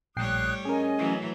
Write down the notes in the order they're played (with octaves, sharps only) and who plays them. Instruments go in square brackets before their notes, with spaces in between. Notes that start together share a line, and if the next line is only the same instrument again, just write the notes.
[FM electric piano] A#1 G5 C7 [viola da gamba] A2 G3 C#5 [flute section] D#6 F#6
[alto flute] C#4 [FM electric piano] G#4 A#4 [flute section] D#5 G#5
[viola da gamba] E3 F#3 A3